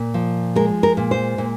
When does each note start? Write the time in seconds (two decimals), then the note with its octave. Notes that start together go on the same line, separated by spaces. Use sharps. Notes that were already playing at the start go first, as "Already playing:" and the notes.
Already playing: A#2
0.14 F3
0.55 G#3 A#4
0.83 A#4
0.97 A#2
1.11 C5
1.38 A#2